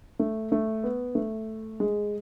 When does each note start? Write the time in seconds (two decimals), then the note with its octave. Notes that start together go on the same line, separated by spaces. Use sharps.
0.19 A3
0.52 A3
0.84 B3
1.15 A3
1.80 G#3